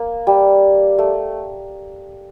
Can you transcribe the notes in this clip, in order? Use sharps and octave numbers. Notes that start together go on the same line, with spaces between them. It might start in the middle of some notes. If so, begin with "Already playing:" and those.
Already playing: A#3
G3
A3